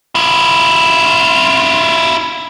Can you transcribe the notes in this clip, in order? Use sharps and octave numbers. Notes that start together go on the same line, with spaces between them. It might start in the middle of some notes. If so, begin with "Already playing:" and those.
E4 F4